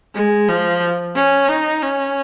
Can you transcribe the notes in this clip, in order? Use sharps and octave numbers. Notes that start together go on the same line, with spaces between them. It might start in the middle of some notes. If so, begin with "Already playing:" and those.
G#3
F3
C#4
D#4
C#4